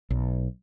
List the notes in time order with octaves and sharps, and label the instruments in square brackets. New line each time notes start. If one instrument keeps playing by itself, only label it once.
[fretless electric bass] B1